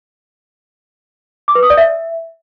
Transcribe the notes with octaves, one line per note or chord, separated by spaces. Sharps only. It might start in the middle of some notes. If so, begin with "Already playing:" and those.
D6
B4
D#6
D5
E5